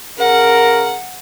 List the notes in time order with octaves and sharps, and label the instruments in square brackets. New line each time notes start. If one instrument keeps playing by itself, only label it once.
[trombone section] C#3 A#4 [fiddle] F#5